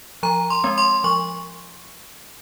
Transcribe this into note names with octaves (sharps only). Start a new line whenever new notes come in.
F3 A#5
C6
G#3 C4
C6
F3 C#6